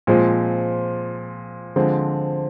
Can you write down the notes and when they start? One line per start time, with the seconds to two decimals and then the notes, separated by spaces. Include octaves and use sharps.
0.07 A#2 F3 G#3 C4
1.76 D3 F3 G#3 C4